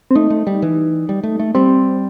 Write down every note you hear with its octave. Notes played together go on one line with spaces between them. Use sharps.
C4
A3 D#4
A3
G3
E3
G3
A3
A3
G3 C4